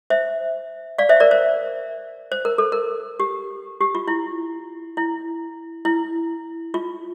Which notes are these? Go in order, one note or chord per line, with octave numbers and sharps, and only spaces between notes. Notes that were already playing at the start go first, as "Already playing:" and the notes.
C5 E5
D5 F5
C5 E5
A#4 D5
C5
C5
A#4
A4
A#4
G4
G4
F4
E4
E4
E4
F4